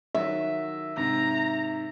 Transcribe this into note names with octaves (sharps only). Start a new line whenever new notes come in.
D#3 F#3 E5
G#2 C3 A#5